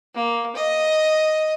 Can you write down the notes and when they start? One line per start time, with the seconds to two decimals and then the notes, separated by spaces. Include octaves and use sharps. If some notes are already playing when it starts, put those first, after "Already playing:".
0.15 A#3
0.56 D#5